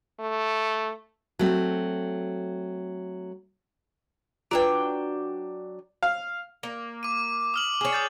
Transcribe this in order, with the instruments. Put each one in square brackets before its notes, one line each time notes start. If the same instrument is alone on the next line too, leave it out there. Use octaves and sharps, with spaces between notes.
[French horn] A3
[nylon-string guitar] F#3 A3 C4
[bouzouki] F#3 D4 G5 [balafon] F4 B4
[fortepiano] F5
[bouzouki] A#3
[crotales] D6 D#7
D#6 F6 F#7
[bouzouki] G#4 C#5
[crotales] D#6 G6 A6